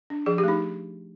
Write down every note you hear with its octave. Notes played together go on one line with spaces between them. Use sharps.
D4
F3 G#4
G4
A3 D#4